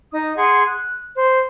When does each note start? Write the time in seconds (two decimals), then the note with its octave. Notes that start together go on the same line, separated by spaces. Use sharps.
0.10 D#4 D#6
0.37 G#4 F#5 C6
0.66 F#6
1.15 C5